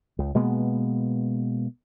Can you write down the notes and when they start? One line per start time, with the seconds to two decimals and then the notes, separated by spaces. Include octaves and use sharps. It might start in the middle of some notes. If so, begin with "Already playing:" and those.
0.19 C#2
0.35 B2 G#3 A#3 B3